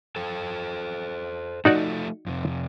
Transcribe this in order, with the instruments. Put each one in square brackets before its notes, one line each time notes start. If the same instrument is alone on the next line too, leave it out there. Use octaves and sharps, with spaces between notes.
[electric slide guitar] A4 C5 G5
[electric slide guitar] F3 A3 [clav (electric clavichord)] D#4 F#4 D5
[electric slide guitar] F2 C3